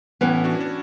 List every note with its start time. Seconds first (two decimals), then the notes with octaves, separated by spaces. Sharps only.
0.21 A2 E3 B3 C#4 E4
0.44 D4 F#4
0.60 D4